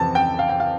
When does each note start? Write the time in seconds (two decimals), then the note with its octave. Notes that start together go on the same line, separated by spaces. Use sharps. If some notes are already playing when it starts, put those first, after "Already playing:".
Already playing: F2 C3 E3 A5
0.15 G5
0.39 F5
0.49 G5
0.60 F5